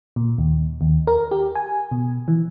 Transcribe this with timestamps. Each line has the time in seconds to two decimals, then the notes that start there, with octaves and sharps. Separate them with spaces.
0.16 A#2
0.38 D#2
0.81 D#2
1.07 A#4
1.31 G4
1.55 G#5
1.91 B2
2.28 E3